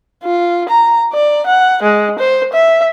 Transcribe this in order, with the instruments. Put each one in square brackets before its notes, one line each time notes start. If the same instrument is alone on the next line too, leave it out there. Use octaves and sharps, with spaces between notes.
[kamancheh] F4
A#5
D5
F#5
G#3
C5
E5